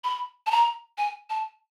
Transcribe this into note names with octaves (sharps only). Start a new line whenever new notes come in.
B5
A5
A#5
G#5
A5